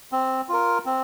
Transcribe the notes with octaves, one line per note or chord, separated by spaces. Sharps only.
C4
F4 A#4
C4